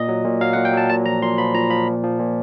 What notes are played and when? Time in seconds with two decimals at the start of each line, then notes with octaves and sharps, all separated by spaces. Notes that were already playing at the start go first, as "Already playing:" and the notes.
Already playing: A#2 D#5
0.09 F#3
0.25 A#2
0.41 F#3 F5
0.53 F#5
0.57 A#2
0.65 G5
0.74 F#3 A5
0.90 A#2 A5
1.06 F3 A#5
1.22 A#2 C6
1.38 F3 B5
1.55 A#2 A#5
1.70 F3 B5
1.87 A#2
2.03 F3
2.19 A#2